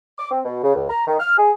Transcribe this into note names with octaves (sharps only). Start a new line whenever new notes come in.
D6
C4
B2
C#3
C#2
A#5
D#3
F6
G#4